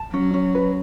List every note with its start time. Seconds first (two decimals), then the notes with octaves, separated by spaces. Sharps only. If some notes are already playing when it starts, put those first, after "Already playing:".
Already playing: A5
0.13 F#3 C#4
0.34 C#4
0.55 B4